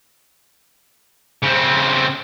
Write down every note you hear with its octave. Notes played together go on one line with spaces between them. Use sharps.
C#3 C4